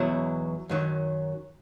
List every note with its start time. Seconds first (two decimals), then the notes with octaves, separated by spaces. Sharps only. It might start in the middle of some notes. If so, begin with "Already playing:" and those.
Already playing: E2 B2 F#3 E4
0.69 F#2 D#3 F#3